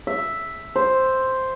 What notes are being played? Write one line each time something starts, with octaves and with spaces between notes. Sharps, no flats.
E5
C5